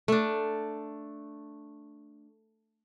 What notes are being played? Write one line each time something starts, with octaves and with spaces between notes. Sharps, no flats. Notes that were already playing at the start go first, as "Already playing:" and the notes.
A3 D4